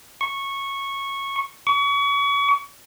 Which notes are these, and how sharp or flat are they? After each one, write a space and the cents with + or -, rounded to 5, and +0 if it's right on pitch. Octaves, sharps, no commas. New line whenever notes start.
C#6 -10
C#6 +35